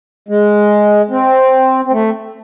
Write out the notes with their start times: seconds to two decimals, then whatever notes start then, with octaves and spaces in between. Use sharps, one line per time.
0.29 G#3
1.10 C4
1.85 C4
1.92 A3